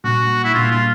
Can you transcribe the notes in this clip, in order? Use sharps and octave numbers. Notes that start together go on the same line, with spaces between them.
A#2 G3 A#3 D4 F#4
E4
A#2 G3 A#3 D4 F4
F4